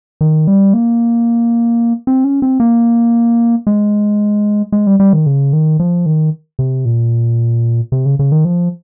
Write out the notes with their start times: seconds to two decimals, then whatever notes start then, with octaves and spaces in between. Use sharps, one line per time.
0.21 D#3
0.48 G3
0.74 A#3
2.07 C4
2.24 C#4
2.42 C4
2.60 A#3
3.67 G#3
4.72 G#3
4.87 G3
5.00 G3
5.13 D#3
5.26 C#3
5.53 D#3
5.79 F3
6.06 D#3
6.59 C3
6.85 A#2
7.92 C3
8.06 C#3
8.19 C#3
8.32 D#3
8.45 F3